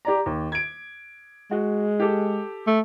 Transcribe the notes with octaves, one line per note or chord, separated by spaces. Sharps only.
G4 D5 A#5
D#2
G#6 D7
G#3 F#4
G4 A4
A3